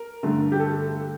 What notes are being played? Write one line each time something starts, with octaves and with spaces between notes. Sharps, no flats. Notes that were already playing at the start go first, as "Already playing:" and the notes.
Already playing: A#4
G2 D3 A3
G4
A4